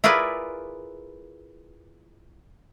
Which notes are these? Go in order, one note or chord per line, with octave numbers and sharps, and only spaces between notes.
E4 F4 G#4 A#4 B4 D5